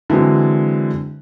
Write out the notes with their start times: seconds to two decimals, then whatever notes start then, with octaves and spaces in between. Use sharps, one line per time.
0.10 D3 E3 F#3 G#3 C4